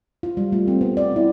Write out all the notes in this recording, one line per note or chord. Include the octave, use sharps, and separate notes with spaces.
F4
G3
A3
C4
B3
D5
E4